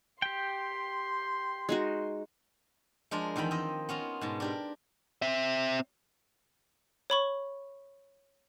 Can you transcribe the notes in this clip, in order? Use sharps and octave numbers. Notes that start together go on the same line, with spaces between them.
G4 G5 C6
G#3 D#4 F#4
F3 G#3 D4 A#4
E2 D#3 F3 G5 B5
C4 D#5
B3 C#4 F4 A#5
G#2 B2 A5
D4 G4 A#4
C4 E5
C#5 B5 C#6